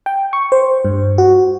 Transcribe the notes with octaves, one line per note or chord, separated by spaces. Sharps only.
G5
C#6
C5
G2
F#4